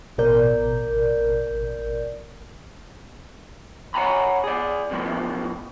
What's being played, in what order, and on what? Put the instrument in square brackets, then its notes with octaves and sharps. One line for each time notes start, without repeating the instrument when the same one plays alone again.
[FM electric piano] A1 B2 A#4 D5 G6
[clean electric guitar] C#5 F#5 G#5 A#5 B5
G#4 D5
B2 F3 A3 A#3